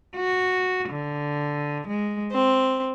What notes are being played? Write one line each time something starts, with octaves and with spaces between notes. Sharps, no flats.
F#4
D3
G#3
C4